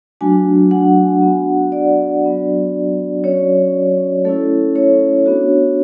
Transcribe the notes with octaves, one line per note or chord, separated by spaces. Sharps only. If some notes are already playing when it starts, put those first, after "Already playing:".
F#3 A3 D4 F#4 G#5
F#5
B3 D4 F#4
D5
F#3 B3 D4 F#4
F#3 C#4 F#4 C#5
A3 C#4 E4 A4
C#5
B3 D4 F#4